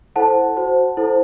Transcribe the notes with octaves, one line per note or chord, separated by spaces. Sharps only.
E4 A4 C5 F#5 A5
F#4 C5
E4 A4 C5